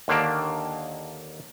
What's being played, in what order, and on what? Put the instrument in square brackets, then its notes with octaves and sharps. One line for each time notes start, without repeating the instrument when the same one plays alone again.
[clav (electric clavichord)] D#2 D3 D#3 A#3 D4